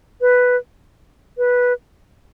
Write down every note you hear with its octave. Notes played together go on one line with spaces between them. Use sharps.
B4
B4